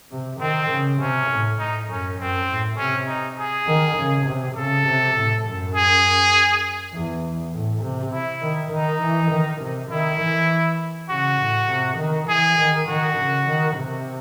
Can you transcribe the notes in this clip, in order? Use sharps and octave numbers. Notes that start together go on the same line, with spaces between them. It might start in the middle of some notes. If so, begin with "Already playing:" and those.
C3
D#3 C4
C#3
C3 C#4
A2
A2 D#4
F#2 C#4
F#2 C4
A2
C3 C#4
D#4
G#4
D#3
C#3
C3
C#3 A4
C3
A2
F#2
G#4
E2
A2
C3
E4
D#3
D#3 D#4
E3
D#3
C3
D#3 E4
E3
C#3 F#4
A2
C3
D#3
E3 G#4
D#3
D#3 F#4
C#3
D#3
C3